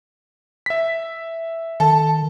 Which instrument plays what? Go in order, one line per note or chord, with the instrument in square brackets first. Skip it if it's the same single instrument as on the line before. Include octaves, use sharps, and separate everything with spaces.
[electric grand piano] E5 B6
[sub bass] D#3 [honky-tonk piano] A4